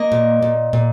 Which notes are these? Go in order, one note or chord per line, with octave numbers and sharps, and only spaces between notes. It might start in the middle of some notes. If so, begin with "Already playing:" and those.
Already playing: A#3 D#5
A#2
A#2
A#2